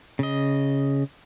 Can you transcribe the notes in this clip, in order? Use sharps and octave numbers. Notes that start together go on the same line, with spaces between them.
C#3 D#5